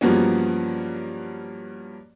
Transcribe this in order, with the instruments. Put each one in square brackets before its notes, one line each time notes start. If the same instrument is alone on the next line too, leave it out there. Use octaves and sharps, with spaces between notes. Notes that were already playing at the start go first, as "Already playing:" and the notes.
[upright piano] G2 F3 F#3 A#3 B3 C#4